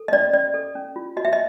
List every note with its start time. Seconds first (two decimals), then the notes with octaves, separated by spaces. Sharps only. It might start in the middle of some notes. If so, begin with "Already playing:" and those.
Already playing: A4
0.08 D#5
0.12 C#4 D5
0.34 C#4 D5
0.54 A4
0.75 C#4
0.96 F4
1.17 F#4 D#5
1.25 E5
1.33 D#5